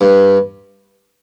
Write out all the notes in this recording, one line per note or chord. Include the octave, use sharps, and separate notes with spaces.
G2